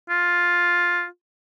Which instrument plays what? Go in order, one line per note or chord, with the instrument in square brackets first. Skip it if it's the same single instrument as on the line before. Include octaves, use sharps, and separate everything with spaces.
[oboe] F4